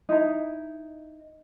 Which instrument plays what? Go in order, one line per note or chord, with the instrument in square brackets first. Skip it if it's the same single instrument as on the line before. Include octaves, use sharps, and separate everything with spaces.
[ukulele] D#4 E4 A#5